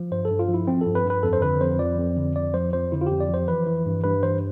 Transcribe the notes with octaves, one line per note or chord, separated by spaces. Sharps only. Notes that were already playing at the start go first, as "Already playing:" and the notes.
Already playing: F3
G2 C5
A4
G2
F4
F3
E4
F3 C4
G2 A4
B4
G2
B4
F2 A4
C5
D3 B4
F2 C5
F3 D5
F2
D3
F2 D5
F3 C5
F2 C5
D3 E4
F4
F2 G4
D5
F3 C5
E3 B4
E3
G2
G2 B4
E3 C5